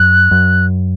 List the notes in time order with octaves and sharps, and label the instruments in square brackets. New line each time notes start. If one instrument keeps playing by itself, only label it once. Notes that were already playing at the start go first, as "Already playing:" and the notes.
Already playing: [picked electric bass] F#2 [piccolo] F#6
[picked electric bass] F#2